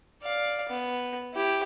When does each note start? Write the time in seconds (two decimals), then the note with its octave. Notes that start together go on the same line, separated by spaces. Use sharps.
0.23 D5 F5
0.69 B3
1.33 E4 G4